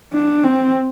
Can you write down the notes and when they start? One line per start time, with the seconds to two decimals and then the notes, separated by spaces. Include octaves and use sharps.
0.13 D4
0.44 C4